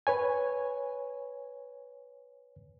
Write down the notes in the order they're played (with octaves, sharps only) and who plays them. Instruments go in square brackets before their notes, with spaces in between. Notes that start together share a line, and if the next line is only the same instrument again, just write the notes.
[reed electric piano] B4 C#5 G#5